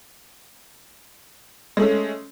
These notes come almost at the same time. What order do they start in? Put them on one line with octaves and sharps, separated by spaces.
G#3 A3 C#4